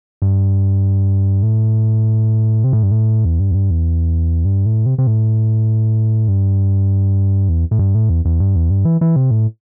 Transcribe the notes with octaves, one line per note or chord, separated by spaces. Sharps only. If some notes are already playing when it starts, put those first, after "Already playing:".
G2
A2
C3
A2
G2
A2
E2
G2
E2
G2
E2
G2
A2
C3
C3
A2
G2
E2
A2
G2
A2
E2
E2
G2
E2
G2
E3
E3
C3
A2